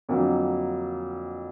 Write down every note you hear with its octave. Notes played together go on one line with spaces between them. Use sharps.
F2 D3 F#3 A#3